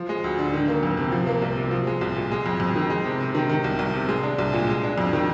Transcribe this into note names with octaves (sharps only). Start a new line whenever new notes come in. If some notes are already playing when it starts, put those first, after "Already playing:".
Already playing: F3
G#3
D2
D3
D#3
A#3
F2
C3
F3
A#3
C2
C3
F3
G#3
C2
A#2
G#3
F2
F2
D#3
G#3
C3
C3
D#3
D#3
C2
C2
C3
G#3
D4
C2
A#2
G#3
D4
F2
D#3